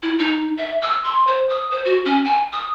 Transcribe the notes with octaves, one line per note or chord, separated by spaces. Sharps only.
E4
D#4
E5
E6
C6
C5
D#6
C5
F#4
C#4
G#5
D#6